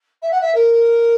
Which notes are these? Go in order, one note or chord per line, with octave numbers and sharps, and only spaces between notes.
E5
F#5
E5
A#4